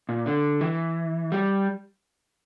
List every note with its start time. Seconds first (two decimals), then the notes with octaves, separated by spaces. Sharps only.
0.09 A#2
0.26 D3
0.61 E3
1.32 G3